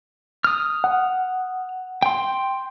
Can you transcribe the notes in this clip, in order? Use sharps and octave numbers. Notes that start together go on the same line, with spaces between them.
D#6 F6
F#5
G5 C6